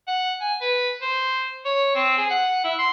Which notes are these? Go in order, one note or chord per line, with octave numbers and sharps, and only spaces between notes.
F#5
G#5
B4
C5
C#5
C4
G#4
F#5
E4
C6